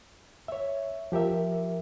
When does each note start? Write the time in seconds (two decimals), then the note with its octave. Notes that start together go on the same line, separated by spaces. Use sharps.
0.48 C#5 E5
1.12 F3 G4 A#4 E5